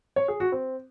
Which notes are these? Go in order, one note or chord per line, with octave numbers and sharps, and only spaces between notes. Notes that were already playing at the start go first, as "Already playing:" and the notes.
C#5
G#4
F#4
C4